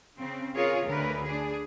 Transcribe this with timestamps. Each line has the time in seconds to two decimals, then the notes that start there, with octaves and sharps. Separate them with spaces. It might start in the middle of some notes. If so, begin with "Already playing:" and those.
0.16 C#3 C4
0.56 F4 G#4 A#4 C#5
0.87 D2 A#4 B4
1.24 D4 G#4